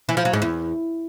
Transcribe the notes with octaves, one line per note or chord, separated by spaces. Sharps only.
E3
F3
F#3
G#2
E2